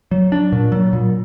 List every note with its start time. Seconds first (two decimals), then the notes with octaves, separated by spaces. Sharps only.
0.11 F#3
0.32 D4
0.52 A#2
0.72 F#3
0.93 A#2